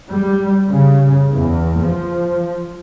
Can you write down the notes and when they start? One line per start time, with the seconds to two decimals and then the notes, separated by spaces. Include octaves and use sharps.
0.10 G3
0.69 C#3
1.33 E2
1.82 F3